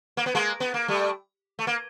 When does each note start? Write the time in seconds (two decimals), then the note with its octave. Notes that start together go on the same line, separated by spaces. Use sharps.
0.17 A#3
0.26 B3
0.35 G#3 A#3
0.60 B3
0.74 A#3
0.88 G3 A3
1.59 A3
1.67 A#3